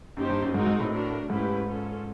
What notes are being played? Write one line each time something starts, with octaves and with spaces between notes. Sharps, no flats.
F#2 A#3 D#4 G4 C5
G2
F#2
G#2 G#3 C4 D#4 F#4 A#4
G#2
A2
A3 D4 F#4 A#4
G#2 A3 C#4 E4 G4 B4
C#4 F4 A4